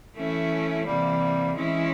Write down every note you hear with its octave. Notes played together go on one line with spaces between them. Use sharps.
E3 A3 C#4 E4
C3 E3 G3 A#3
E3 G#3 C#4 E4